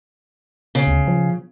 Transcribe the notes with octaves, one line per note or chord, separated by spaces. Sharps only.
C#3
D2
F3